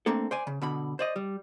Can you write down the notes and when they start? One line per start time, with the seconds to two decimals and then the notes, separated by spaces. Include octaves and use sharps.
0.06 A3 A#3 C4 D4 A4
0.31 C5 D5 G#5
0.47 C#3
0.62 B2 D3 B5
0.99 C5 D5 D#5
1.16 G3